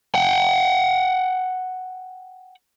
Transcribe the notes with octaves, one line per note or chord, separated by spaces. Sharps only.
F#5 G5